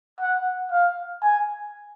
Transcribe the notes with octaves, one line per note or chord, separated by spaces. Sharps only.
F#5
F5
G#5